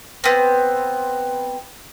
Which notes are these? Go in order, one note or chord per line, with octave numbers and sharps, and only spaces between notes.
B3 C4